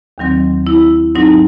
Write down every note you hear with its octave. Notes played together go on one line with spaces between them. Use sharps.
D#2 D#3 F#3 C4
E4
G#2 F#3 C4 D#4